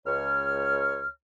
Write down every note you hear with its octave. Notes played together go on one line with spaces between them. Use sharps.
C#2 C#5 F6